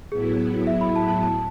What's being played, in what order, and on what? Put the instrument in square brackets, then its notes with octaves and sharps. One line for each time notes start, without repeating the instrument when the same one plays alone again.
[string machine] A2 F#3 B3 E4 [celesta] G#4
[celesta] E5
B5
A5
A5
A5